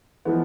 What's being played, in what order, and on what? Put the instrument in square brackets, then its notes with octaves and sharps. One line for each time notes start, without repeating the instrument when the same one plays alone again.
[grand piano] E3 [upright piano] F3 G#3 B3